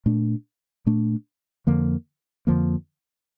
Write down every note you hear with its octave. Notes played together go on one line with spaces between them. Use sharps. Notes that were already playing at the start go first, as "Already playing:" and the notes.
A#2 A3 D4
A#2 A3 D4
F2 D3 F3 A#3
F2 D3 F3 A#3